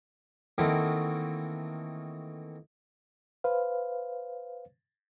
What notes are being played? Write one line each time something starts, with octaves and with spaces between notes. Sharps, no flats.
D#3 E3 A3 A#3 C4 F#4
B4 C5 F5